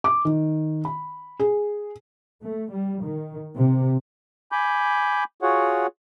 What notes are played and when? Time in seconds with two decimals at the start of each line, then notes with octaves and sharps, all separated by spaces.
0.04 D6
0.25 D#3
0.85 B5
1.39 G#4
2.42 A3
2.71 G3
3.03 D#3
3.55 C3
4.52 G#5 B5 D6 G6
5.42 F4 F#4 G#4 C#5 F#5